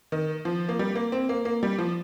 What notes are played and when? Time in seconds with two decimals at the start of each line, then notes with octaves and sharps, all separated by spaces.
0.12 D#3
0.45 F3
0.69 A#3
0.79 G3
0.95 A#3
1.12 C4
1.29 A#3
1.45 A#3
1.63 G3
1.78 F3